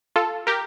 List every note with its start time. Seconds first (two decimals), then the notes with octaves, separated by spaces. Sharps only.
0.16 F4 A4
0.47 G4 A#4